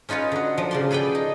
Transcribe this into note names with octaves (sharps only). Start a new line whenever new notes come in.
C#4 D#4 F4 B4 C#5
D3 F#4
F3 F#3
C#3 D5 C6
G#4 A4 B4 D5 G5
D#4